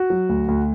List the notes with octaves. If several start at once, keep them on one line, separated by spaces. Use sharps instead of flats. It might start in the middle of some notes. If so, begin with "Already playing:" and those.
Already playing: F#4
F#3
D2
D2